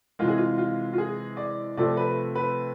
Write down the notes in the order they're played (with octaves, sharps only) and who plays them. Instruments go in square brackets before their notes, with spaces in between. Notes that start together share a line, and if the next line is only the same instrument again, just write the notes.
[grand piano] C3 E3 G#3 F4
G#4
F4
F4
F4
G#4
D5
C3 F3 A3 C4 D5
B4
B4